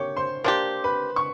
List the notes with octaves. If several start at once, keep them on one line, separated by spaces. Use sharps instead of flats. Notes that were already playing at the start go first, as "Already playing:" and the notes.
Already playing: A#3 G4 C#5 C#6
C5 C6
A#3 D4 G4 C5 C6
B4 B5
C#6